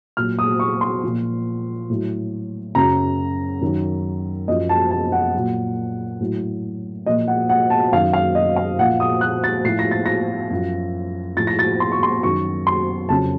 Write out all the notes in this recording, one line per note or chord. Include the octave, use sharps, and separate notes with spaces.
A#2 F#3 F6
D#6
C#6
C6
A#2 F3
A2 F#3
F#2 C#3 F#3 A#5
F#2 D#3 F#3
F#2 F3 D#5
A5
A5
F#5
A#2 F#3
A2 F#3
A#2 F3 D#5
F#5
F#5
A5
F#2 D#3 F#3 F5
F5
D#5
F5
A#2 F3 F#5
D#6
F#6
A6
A2 F3 C7
A#6
A6
A#6
F#2 F3
A2 F3 A6
A#6
A6
C6
C#6
C6
F#2 D#3 F#3 C#6
C6
F2 C#3 F#3 A5